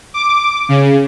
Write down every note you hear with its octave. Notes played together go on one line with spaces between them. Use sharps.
D6
C#3